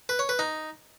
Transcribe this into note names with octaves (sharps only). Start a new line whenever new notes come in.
B4
C#5
B4
D#4